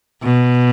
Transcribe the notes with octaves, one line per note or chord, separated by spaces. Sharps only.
B2